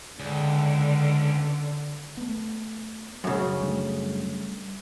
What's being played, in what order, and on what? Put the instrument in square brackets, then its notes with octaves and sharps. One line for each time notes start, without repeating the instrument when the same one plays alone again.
[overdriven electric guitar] C#2 [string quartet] D3
[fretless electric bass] A3 B3
[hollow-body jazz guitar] F#2 C#3
[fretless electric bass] G3 A3 D4